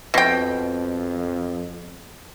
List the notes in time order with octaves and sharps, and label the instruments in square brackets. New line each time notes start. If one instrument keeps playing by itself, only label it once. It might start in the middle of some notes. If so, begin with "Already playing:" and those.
[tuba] F2 [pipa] B2 G5